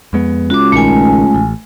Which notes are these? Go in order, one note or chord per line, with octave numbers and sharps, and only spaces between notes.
F2 G#3 B3
C#2 F#4 D6
A#1 D#3 A3 G#5
A1